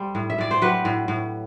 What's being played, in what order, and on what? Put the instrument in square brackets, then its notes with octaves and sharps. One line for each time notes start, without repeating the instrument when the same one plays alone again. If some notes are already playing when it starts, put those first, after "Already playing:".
Already playing: [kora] G3 A4 C5
A2
E5
A2 D5
C5
F#3 G4 B4
A2
A2